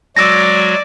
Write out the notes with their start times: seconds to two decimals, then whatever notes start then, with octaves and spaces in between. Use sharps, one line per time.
0.17 F#3 G#3 F#4 D5 E6 A#6